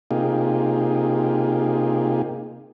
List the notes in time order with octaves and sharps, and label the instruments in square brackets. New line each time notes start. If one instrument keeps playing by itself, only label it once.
[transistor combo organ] C3 A#3 D#4 F4 G4 G#4